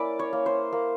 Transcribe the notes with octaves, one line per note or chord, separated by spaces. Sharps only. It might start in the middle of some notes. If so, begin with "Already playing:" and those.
Already playing: A#3 C#4 E4 D5
C#5
A#3
C5
A#3